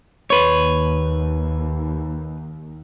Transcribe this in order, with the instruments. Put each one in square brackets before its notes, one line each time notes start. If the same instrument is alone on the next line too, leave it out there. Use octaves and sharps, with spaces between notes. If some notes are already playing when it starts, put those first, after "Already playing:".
[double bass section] D#2 [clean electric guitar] B4 C#5